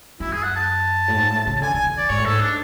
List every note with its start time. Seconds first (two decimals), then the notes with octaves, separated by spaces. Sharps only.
0.20 F#2 E4
0.32 G#4
0.43 F#5
0.56 A5
1.08 A2
1.15 G#2
1.30 A2
1.47 C#3
1.62 D3 G#5
1.74 D3 G#5
1.85 E3
1.98 D5
2.09 G#2 C#5
2.18 A2
2.25 G#2 A4
2.41 D4